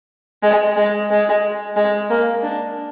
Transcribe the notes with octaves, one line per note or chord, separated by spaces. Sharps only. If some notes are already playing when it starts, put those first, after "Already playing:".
G#3
G#3
G#3
G#3
A#3
D4